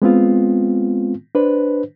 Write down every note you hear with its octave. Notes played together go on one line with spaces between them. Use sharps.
G#3 B3 C4 F4
D4 B4 C5